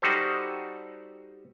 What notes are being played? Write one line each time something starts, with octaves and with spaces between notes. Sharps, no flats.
G3 D#4 F#4 G4 A4 C5